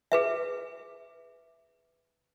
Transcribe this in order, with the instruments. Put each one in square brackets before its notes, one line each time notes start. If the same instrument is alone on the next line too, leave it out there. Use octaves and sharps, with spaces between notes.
[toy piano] G#4 B4 E5